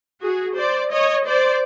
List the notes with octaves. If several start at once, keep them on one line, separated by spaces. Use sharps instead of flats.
F#4 G#4
C5 D5
C#5 D#5
C5 D5